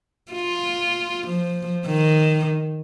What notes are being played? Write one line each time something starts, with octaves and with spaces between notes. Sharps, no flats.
F4
F3
D#3